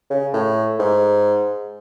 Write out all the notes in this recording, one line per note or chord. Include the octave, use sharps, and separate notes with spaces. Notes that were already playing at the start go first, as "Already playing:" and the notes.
C#3
A2
G#2